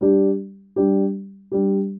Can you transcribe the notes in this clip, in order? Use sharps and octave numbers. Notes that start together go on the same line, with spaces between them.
G3 D4 G4
G3 D4 G4
G3 D4 G4